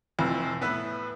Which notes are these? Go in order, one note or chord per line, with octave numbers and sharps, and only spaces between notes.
F1 F2 E3
A2 B3 B4 E6